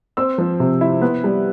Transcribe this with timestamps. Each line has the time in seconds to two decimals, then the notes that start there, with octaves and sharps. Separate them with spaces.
0.17 C4 E6
0.38 F3
0.60 C3
0.81 E4
1.02 B3
1.24 G3